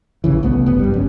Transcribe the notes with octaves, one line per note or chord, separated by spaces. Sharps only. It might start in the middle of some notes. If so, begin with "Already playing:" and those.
A1 C#3 E3
C2 A3 B3
F#1 F2 B3
G2 G3
G1 F#3 C#4